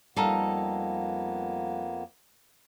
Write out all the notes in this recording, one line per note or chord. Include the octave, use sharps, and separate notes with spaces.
F2 G3 A#3 B3 D#4 A4 F5